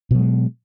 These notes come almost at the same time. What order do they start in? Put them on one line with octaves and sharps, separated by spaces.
B2 F#3 G#3